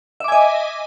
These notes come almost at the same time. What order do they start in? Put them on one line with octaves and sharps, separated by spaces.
E5 D6 G#5 D#5